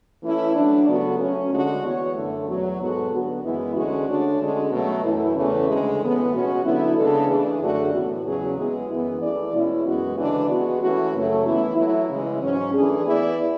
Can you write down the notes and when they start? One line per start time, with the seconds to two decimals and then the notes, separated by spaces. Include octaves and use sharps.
0.23 E3 A3 C#4 E4
0.55 F#3 A3 D4
0.87 C#3 F#3 B3 F#4 A4
1.19 F#3 A3 C#4
1.51 D2 D3 G#3 D4 F#4
1.83 E3 B3 F#4 C#5
2.15 F#2 D3 A3
2.47 E2 B2 F#3
2.80 G#2 G#3 B3 F#4 A4
3.11 D3 F#3 B3 F#4
3.43 F#2 E3 G#3 B3 E4
3.75 D2 D3 G#3 C#4 F#4
4.08 D3 A3 D4 F#4 C#5
4.39 D3 G#3 C#4
4.71 B2 F#3 A3
5.04 F#2 E3 A3 E4
5.35 E2 C#3 E3 A3 C#4
5.68 D2 C#3 G#3
6.01 A2 E3 B3
6.32 B2 G#3 C#4 F#4
6.64 D3 F#3 B3 E4
6.96 C#3 G#3 B3 D4 A4
7.28 E3 A3 D4 G#4
7.60 F#2 D3 A3 D4 F#4
7.93 A2 E3 B3 F#4
8.24 E2 C#3 F#3 C#4 G#4
8.57 G#3 B3 E4 G#4
8.89 F#2 E3 B3
9.21 E3 A3 E4 G#4 D5
9.53 B2 G#3 C#4 E4
9.85 F#2 E3 G#3 B3 F#4
10.17 D2 C#3 E3 G#3 D4
10.49 G#3 B3 F#4
10.82 E3 A3 C#4 F#4
11.14 F#2 C#3 F#3 A3
11.46 E3 B3 E4
11.77 F#3 A3 E4
12.10 C#3 E3 G#3
12.42 G#2 F#3 C#4
12.74 E3 A3 D4 G#4
13.06 E3 B3 E4 G#4 D5